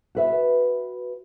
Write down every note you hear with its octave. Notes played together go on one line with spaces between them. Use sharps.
F#4 B4 E5